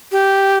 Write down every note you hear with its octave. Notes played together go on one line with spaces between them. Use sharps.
G4